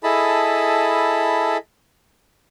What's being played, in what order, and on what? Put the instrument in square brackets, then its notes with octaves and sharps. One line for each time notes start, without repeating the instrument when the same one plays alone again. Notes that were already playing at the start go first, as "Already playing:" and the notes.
[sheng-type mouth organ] E4 G#4 A4 D#5 A5 B5